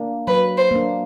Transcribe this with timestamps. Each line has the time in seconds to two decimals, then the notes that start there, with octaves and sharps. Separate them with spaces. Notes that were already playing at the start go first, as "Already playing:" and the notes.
Already playing: A#3 D4
0.27 F#3 B4
0.57 C5
0.71 A#3 D4